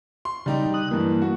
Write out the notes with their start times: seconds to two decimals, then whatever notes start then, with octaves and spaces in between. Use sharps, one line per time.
0.25 C6
0.46 C#3 G3 D#4 G4
0.74 D#6 F#6
0.91 G2 E3 A#3
1.22 F#4